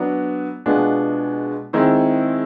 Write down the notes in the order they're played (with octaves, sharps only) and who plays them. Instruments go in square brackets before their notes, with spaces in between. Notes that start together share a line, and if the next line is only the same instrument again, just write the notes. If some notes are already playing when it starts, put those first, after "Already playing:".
Already playing: [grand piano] F#3 B3 D4 F#4
B2 G#3 B3 D4 F4
D#3 G#3 C4 E4